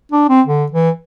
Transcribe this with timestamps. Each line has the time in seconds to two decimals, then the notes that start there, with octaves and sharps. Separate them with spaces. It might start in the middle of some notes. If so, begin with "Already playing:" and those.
0.12 D4
0.29 C4
0.47 D3
0.72 E3